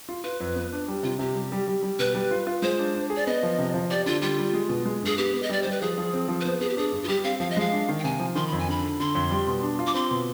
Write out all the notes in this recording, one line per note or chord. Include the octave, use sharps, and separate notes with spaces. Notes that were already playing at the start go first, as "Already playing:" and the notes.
F4
F4 B4
F2
B3
D4
G3
C3 F4
C3 G4
G3
G3
G3
G3
B2 B4
G3
F4
F4
G#3 C5
D4
D4
G#4
D5
B3 D#5
F3
C3
F3
G4 D5
D3 F4
G3 F4
G3
G#3
B2
G#3
G2 G#4
B3 G4
B3
D#5
G3 D5
G3 C5
B4
F3 G#4
F3
C4
F3
B4
B3 C5
B3 G#4
G4
D4 G#4
G2
F4
G3 G4
C4 F5
F3 F5
D#5
G#3 F5
D4
D#3
G5
C3 G#5
F3
D#3 C6
F2 B5
G#5
D3 B5
D3
D3 C6
F2
G3
B2
D4
F4
D6
C4 C6
B2